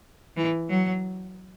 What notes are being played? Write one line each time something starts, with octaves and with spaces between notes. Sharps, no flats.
E3
F#3